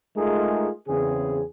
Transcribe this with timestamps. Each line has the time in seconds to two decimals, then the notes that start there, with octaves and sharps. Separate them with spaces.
0.16 G#3 A3 D#4 F4 G#4 A#4
0.88 E2 C#3 C4 G#4